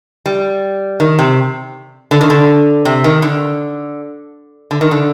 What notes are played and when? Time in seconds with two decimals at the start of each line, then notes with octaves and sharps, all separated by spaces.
0.26 G3
1.00 D#3
1.19 C3
2.11 D3
2.21 D#3
2.30 D3
2.85 C3
3.04 D#3
3.22 D3
4.71 D3
4.81 D#3
4.91 D3